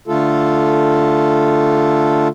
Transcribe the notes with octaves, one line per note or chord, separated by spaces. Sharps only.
D3 A3 F4 A4